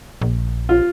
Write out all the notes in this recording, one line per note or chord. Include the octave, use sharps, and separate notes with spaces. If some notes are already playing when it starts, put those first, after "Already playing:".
A#1
F4